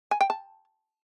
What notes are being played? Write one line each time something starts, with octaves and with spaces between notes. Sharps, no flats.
G#5
G5
A5